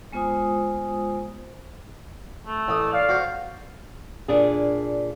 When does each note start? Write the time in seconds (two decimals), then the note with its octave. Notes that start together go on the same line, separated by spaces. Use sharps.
0.12 G#3 B3 F4 C5 G#5 D#6
2.47 A3
2.68 A1 D#6
2.93 D5 F5
3.09 F#4 C5
4.28 A#2 D4 G#4